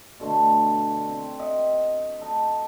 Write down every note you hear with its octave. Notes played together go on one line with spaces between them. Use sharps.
B2 D3 A3 C6
C4
D#5 E5 F#5 G5
D#4 A4 D#5